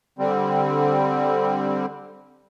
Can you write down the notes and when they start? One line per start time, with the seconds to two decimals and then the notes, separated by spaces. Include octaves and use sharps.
0.19 D3 G3 C4